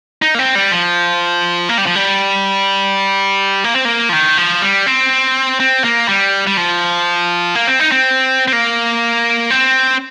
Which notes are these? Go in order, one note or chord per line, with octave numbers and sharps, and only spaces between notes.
D#4
A#3
C4
G3
F3
A#3
G3
F3
G3
A#3
C4
A#3
F3
D#3
F3
G3
C4
C4
A#3
G3
G3
F3
A#3
C4
D#4
C4
C4
A#3
C4